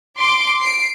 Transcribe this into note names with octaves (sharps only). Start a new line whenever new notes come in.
C6 D6 D7
C7 D7